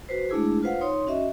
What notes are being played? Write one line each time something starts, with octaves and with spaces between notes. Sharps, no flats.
F#4 B4 C5
G#3 A3 D4 E4 G#4
F4 B4 C5 F5 F#5
D#4 C#5 C6
C#4 F#4 D#5 E5